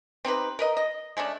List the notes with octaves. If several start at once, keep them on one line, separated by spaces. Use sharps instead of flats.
C4 D#4 G4 B4
A#4 B4 D#5
D#5
G#3 A3 C#4 D4